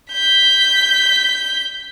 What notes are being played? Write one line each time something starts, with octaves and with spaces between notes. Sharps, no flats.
G6 B6